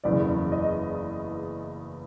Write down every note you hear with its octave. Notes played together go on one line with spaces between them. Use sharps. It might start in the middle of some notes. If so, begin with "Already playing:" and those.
F#1 E2 C#3 D5
D#5